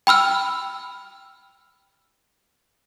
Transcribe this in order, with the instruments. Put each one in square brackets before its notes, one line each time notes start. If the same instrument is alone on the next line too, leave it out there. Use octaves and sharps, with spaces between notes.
[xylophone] G5 B5 E6 F6